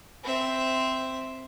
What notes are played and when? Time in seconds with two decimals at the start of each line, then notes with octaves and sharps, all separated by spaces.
0.24 C4 E5